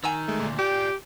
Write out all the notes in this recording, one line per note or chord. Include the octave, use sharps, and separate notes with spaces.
D#3 G#5 A#5 E6
G#3 A3
D2 A#2
F4 G4 D5 G5 D6